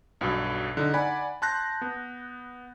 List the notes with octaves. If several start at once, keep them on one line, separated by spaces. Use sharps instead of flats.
B1 G2 B2
D3 D#4
D5 F#5 G#5 B5
A5 C6 F#6 G6 A#6
B3